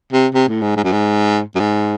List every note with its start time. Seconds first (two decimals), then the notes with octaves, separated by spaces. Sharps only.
0.13 C3
0.34 C3
0.49 A2
0.62 G#2
0.77 G#2
0.84 F#2
0.92 G#2
1.55 F#2
1.60 G#2